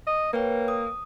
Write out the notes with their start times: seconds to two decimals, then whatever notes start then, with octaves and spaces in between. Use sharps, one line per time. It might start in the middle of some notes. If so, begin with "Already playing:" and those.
0.07 D#5
0.33 A#3 B4 C#5 G5
0.68 D#6